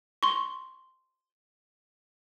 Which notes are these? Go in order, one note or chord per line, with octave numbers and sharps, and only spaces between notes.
C6 C#6